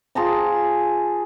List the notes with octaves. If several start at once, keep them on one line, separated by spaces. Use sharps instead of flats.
F4 G#4 A5 A#5